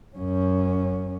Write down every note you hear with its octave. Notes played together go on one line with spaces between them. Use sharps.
F#2 C#4